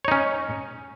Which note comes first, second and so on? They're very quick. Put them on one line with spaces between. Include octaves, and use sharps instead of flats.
C#5 D#4 C#4